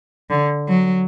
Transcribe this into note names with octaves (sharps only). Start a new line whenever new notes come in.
D3
F#3